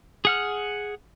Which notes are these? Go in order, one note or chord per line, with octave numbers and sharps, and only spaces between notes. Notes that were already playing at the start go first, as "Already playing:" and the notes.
G#4 F#5 F6